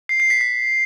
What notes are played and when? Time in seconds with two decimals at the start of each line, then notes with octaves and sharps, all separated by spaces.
0.09 C7
0.20 C7
0.30 B6
0.41 B6